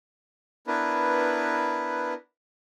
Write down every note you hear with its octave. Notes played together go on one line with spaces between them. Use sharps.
B3 D4 E4 A#4 B4